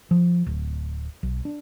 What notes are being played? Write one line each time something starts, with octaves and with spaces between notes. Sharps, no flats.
F3
D1
B1
D4